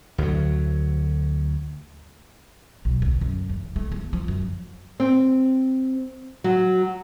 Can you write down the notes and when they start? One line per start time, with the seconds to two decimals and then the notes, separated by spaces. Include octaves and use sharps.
0.18 D2 F#3
2.85 B1
3.02 D2
3.21 F#2
3.50 E2
3.76 A3
3.92 E2
4.13 F3
4.28 F#2
5.00 C4
6.44 F#3